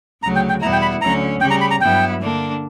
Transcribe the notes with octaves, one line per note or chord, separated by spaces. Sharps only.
D2 C#3 F#3 A#5
G5
G5
E2 B2 G3 B3 E4 A#5
G5
B5
D2 D3 F#3 C#4 A#5
C#3 G3 C#4 G4 G5
A#5
B5
A#5
G2 F#3 B3 E4 G5
D3 A#3 D4